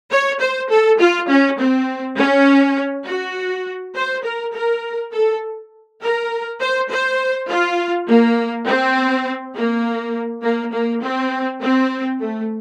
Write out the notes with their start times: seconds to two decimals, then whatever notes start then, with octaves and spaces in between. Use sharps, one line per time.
0.11 C#5
0.40 C5
0.70 A4
0.99 F4
1.28 C#4
1.59 C4
2.17 C#4
3.06 F#4
3.94 C5
4.23 A#4
4.53 A#4
5.12 A4
6.01 A#4
6.60 C5
6.89 C5
7.48 F4
8.07 A#3
8.67 C4
9.55 A#3
10.43 A#3
10.73 A#3
11.02 C4
11.61 C4
12.20 A3